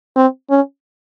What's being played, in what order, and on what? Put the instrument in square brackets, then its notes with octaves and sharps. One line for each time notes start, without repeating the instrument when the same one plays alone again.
[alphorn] C4
C#4